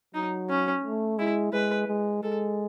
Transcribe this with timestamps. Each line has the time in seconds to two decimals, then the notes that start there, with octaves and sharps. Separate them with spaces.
0.14 F#3 D#4
0.49 C#4
0.84 A3
1.18 G#3 E4
1.53 G#3 B4
1.88 G#3
2.23 G#3 A4